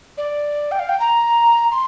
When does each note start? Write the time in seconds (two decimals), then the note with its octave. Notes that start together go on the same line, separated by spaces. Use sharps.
0.17 D5
0.71 G5
0.79 F5
0.89 G5
1.00 A#5
1.71 C6